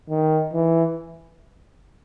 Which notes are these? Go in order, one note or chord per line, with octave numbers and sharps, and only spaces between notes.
D#3
E3